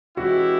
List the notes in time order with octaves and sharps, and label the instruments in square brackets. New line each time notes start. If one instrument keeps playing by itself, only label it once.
[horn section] E3 G#3 C#4 E4 G4 [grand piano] F#4